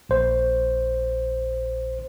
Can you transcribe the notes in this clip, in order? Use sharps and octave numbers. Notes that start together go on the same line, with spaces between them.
A#1 C5